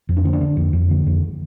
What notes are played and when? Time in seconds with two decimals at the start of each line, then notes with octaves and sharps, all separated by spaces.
0.09 F2
0.16 D4
0.24 D3 C#4
0.33 D4
0.41 D3
0.57 F2
0.73 F2
0.90 D3
1.06 F2